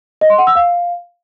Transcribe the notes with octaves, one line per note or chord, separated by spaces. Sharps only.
D#5
C6
F#5
E6
F5